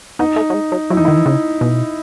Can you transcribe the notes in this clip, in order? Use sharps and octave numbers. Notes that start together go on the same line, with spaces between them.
B3 D#4
A3
F#3
G#3
F#3
F#3 E4
E3 D#4
D#3 E4
E3
C#3
B2